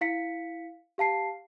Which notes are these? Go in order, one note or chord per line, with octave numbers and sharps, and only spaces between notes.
E4 F5 B6 C#7
G4 F5 A5 C7